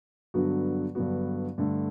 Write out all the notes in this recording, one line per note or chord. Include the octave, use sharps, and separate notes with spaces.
G2 D3 F#3 B3 F#4
G2 D3 F#3 B3 F#4
G2 D3 A3